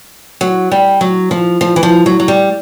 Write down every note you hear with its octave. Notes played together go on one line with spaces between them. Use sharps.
F#3
G3
F#3
F3
F3
E3
F3
F#3
F#3
G3